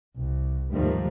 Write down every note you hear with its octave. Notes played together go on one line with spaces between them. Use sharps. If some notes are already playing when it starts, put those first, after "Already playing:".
C2
D#2 G#2 D#3 F3 G3 A3